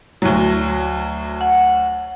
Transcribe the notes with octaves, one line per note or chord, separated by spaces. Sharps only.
D2 F#3
F#5